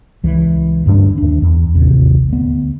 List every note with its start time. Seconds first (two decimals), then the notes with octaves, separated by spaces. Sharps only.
0.23 C#2 E3
0.86 D2 G2 A3 D4
1.18 D#2 D4
1.42 E2
1.75 A1 D#2 C3
2.29 D2 B3